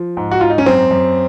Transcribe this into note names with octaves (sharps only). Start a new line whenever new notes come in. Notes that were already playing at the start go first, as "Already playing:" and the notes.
Already playing: F3
G#2
F#4
G#2 F4
D#4
C#4
F#2 C4
F#2